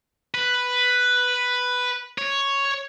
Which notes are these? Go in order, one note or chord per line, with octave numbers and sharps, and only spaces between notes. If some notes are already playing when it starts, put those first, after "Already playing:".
B4
C#5